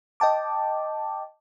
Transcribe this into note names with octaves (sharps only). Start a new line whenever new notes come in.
D#5 G5 A5 D6